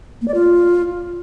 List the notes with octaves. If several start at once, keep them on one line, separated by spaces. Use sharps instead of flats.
A#3
D5
F4